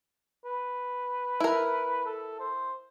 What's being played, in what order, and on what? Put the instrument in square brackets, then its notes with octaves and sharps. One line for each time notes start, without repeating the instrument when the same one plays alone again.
[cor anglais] B4
[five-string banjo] E4 A#4
[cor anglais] A4
C5